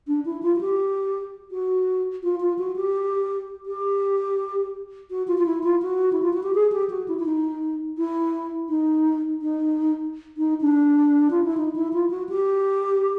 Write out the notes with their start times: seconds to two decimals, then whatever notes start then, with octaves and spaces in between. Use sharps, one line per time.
0.07 D4
0.25 E4
0.42 F4
0.56 F#4
0.61 G4
1.51 F#4
2.23 F4
2.40 F4
2.59 F#4
2.76 G4
3.66 G4
5.11 F#4
5.28 F4
5.38 F4
5.46 E4
5.64 F4
5.82 F#4
6.13 E4
6.22 F4
6.33 F#4
6.43 G4
6.55 G#4
6.72 G4
6.90 F#4
7.08 E4
7.19 E4
7.26 D#4
7.98 E4
8.69 D#4
9.42 D#4
10.37 D#4
10.61 D4
11.31 F4
11.44 E4
11.57 D#4
11.76 E4
11.93 F4
12.10 F#4
12.29 G4